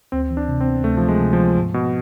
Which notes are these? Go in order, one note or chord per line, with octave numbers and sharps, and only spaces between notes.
D2 C4
E3
D4
C3
C4
B3
D2 A3
E3 F3
G#3
C3
F3
B3
G#2
B2 G#3